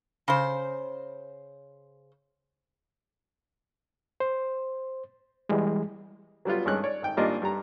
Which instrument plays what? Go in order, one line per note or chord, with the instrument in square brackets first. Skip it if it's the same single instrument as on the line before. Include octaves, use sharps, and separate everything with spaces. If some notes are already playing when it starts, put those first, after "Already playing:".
[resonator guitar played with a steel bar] C#3 C5
[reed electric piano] C5
E3 G3 G#3
[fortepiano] F#3 G3 B3 F4
G#1 G2 G#3 C#4 F#6
C#5 D5
G#1 G5
G#1 G3 A#3 D4 F4 D#5
G2 G3 A#5